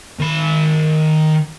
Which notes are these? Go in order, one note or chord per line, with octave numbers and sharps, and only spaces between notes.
D#3 B5